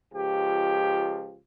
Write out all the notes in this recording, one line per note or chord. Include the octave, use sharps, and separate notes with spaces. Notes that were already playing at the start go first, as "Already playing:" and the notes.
C#2 F3 G4